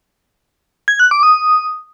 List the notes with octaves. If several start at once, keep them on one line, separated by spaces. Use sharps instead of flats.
G#6
F#6
D6
D#6